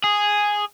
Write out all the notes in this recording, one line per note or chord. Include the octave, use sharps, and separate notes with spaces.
G#4